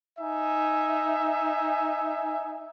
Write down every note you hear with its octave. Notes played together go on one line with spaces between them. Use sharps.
D#4 E5 G#5